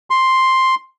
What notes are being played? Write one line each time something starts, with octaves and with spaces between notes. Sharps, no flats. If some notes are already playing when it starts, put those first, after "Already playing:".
C6